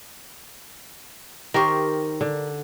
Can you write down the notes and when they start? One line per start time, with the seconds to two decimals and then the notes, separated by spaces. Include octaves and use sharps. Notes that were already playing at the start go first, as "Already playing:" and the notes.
1.54 D#3 G4 A#4 C5 C#6
2.21 D3